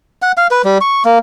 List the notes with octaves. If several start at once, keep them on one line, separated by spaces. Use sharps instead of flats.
F#5
F5
B4
G3
C#6
A#3